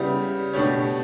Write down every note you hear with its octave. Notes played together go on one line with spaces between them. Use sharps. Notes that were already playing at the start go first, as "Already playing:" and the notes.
Already playing: C#3 G3 B3 E4 G4
B2 A3 D4 G4 C#5